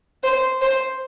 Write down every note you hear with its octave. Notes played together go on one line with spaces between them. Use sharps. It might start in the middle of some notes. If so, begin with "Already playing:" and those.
C5
C5